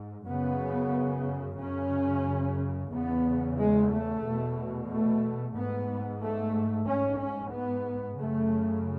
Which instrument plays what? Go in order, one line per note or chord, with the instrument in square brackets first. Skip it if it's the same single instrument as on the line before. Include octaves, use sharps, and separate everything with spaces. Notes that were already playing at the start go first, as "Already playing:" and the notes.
Already playing: [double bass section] G#2
F#2 C#3 B3
F#2 C#3 C#4
E2 C#3 B3
G#3
A3
E2 B2
A3
G#2 B3
A3
G#2 C#4
C#4
B3
F#2 C#3 A3